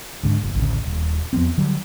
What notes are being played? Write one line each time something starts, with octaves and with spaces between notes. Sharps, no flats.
C#2 G#2 D3
F#1
A1 D2 C#3
D#1
E2 F3 B3 C4
D3 F#3 G3